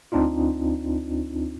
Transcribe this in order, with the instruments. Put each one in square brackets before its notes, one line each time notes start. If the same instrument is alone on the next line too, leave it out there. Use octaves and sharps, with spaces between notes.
[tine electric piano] D2 C4 D4 D#4 F4